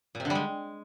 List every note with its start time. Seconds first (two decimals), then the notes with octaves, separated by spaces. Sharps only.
0.15 A#2
0.20 C3
0.25 D3
0.30 G3
0.35 G#3